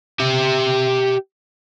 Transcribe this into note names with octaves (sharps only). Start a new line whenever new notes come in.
G4 E5